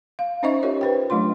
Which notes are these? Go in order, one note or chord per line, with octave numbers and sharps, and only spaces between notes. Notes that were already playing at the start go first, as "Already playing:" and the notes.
F5
C#4 D#4 C5 D#5 E5 C#6
F4 G4 A#4 C#5
B4 C5 G5
F#3 A3 D4 F4 C6